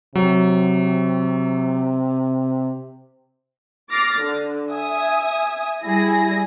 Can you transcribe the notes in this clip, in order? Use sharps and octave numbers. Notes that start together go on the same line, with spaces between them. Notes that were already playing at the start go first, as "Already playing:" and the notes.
C3 F#3
D6 F6 A6 A#6 C7
D3
E5 G#5 D#6
G3 E4 G#4 A#6